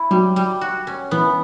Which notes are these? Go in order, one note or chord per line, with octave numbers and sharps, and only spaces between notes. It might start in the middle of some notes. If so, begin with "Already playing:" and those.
Already playing: E4
F#3 G3
G3
F#4
C#4
E3 B3